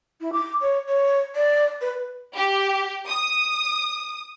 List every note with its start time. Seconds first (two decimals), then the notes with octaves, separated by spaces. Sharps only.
0.20 E4
0.32 D6
0.61 C#5
0.87 C#5
1.35 D5
1.81 B4
2.35 G4
3.08 D#6